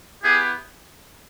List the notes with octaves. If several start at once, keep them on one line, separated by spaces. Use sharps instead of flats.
B3 E4 G4 G#4